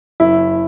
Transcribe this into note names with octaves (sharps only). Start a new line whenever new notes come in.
F#1 E4